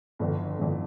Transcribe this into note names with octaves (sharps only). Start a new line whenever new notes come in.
G1 F2 D3
G1 F2 D3